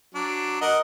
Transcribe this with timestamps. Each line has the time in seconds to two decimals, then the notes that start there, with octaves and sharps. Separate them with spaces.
0.15 F#3 D4
0.61 A#4 D#5 F#5